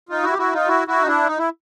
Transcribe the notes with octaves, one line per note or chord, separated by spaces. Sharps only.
D#4 F4
E4 F#4
G4
E4 F#4
D#4 F4
E4 F#4
E4 F#4
D#4
D4 E4
D#4
E4